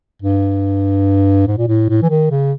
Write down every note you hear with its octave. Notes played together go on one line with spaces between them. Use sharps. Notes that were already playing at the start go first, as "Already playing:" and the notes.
G2
G#2
A#2
A2
A2
E3
D#3
C#3